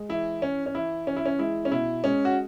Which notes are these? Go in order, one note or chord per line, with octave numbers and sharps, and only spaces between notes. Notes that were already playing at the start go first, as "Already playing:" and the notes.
Already playing: G#3
E3 E4
C#4
C#4
E3 E4
E3 C#4
E4
C#4
G#3 E4
C#4
B2 E4
G#3 C#4
F#4